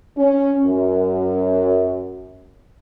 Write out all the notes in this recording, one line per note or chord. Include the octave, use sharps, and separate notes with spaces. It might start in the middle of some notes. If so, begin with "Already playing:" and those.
C#4
F#2